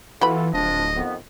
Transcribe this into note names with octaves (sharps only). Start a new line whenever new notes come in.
E3 B3 F4 F#4 A4 B4 B5
D1 F3 D4 D#5
F2 D#3 B3